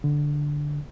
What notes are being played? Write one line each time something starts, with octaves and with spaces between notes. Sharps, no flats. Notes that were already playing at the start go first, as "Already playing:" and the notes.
D3